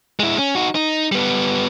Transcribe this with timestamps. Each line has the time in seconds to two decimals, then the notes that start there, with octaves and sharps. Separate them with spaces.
0.20 G#3 E4
0.38 C#4
0.55 D#4 F#4
0.75 D#4
1.12 G3 B3